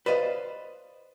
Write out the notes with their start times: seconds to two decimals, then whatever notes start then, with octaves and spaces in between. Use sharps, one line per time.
0.06 B4 C5 D5 D#5 F5